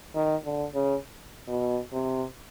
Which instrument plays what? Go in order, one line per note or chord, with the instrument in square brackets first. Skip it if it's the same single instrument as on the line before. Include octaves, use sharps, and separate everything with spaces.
[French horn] D#3
D3
C#3
B2
C3